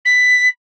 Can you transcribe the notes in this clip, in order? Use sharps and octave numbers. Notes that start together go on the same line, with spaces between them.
B6